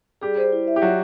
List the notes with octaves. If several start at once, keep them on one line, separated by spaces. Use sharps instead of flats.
G3 G4 G#4
C5
E4
E5
G4
F#3 F4 F#4